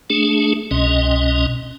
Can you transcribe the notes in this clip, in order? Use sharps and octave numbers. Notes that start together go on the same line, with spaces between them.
A3 D4 G#4
C2 B2 C#4 D#5